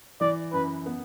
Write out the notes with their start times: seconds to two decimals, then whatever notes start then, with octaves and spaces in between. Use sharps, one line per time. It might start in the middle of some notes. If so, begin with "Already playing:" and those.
0.21 E3 D5
0.53 F#2 B4
0.86 B3